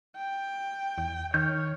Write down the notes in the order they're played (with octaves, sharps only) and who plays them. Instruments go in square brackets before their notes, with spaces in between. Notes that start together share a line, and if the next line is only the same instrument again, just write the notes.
[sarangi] G5
[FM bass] E2
[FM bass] D#3 [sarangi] C#5 [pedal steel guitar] F6 G6